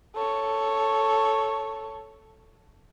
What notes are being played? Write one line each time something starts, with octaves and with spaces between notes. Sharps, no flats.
A4 C#5